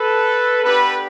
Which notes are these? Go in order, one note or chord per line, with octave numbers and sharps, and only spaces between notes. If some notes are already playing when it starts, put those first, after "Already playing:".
Already playing: A4 B4
B3 D4 G4 A4 B4